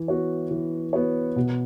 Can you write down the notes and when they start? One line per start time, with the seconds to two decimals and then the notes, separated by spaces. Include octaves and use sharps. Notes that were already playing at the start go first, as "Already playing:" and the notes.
Already playing: E3
0.08 B3 F#4 C#5
0.51 E3
0.93 B3 F#4 C#5
1.36 B2